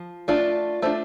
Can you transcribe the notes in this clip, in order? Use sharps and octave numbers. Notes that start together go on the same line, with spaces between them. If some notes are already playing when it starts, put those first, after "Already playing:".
Already playing: F3
A3 D4 F4
A3 D4 F4 C5